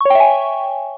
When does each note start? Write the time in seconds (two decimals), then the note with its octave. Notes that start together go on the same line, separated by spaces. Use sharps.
0.01 C#6
0.05 C#5
0.10 G5
0.15 E5
0.20 G#5